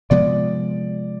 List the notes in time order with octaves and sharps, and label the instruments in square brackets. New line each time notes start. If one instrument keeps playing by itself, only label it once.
[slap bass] C3 F3 G#3 B3 [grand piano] D5